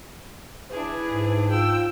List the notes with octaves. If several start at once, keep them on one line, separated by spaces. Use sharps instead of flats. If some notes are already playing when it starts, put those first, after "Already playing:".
D4 E4 G#4 B4
G#2
F4 G5 E6